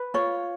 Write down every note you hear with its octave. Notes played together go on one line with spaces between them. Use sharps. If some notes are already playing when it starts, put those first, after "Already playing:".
Already playing: B4
F4 C#5